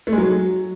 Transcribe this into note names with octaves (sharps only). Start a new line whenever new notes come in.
A3
G#3
F#3